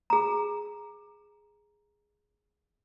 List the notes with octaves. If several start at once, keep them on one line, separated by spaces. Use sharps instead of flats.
G#4 A#5